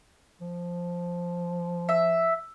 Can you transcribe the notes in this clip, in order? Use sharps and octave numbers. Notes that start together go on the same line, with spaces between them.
F3
E5